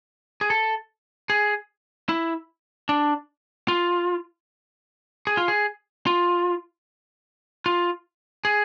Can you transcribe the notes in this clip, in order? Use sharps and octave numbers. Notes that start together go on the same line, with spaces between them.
G#4
A4
G#4
E4
D4
F4
G#4
F4
G#4
F4
F4
G#4